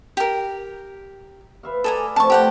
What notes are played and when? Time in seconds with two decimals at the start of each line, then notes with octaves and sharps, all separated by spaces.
0.17 G4 A#4
1.63 B4 E5 F5
1.84 G#4 A4 D5 G#5 A#5
2.16 C3 F3 A3 A5 C#6
2.30 G4 F#5 G5